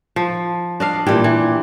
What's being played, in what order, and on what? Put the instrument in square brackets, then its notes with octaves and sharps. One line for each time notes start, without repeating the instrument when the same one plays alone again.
[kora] F3
D4 D#5 F5
[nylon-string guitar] A#2 G4 [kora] E3 G3
[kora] E3